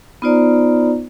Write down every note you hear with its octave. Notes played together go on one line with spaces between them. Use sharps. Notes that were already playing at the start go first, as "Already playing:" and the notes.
B3 D#4 F4 C5 D5 A#5